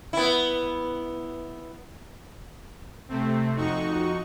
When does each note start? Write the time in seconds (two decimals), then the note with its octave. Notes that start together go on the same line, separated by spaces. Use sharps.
0.13 B3 E4
3.09 C3 A3 C4
3.56 F2 D#4 F#4 C#6